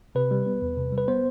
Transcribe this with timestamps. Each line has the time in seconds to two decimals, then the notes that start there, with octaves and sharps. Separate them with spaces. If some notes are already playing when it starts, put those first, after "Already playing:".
0.15 C3 B4
0.31 G3
0.46 B3
0.62 E2
0.77 C3
0.92 G3
0.98 B4
1.08 B3 C5